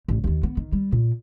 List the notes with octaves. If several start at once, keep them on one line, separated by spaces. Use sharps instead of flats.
A1
D#2 D#3
B3
D#3
G3
A#2